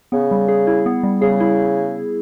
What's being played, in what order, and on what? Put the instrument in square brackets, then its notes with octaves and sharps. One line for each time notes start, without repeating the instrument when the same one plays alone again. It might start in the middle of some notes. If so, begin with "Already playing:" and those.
[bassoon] C#3 [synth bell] B3
[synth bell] G3
G#4
E4
B3
G3
[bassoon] C#3 [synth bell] G#4
[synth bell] E4